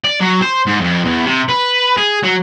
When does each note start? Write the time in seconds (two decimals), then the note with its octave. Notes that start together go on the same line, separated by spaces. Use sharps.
0.04 D5
0.20 F#3
0.41 C5
0.66 G#2
0.81 F2
1.05 E2
1.26 C3
1.49 B4
1.97 G#4
2.23 F#3